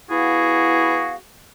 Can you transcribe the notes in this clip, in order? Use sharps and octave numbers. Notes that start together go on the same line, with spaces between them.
B3 E4 F#4 G#4 F5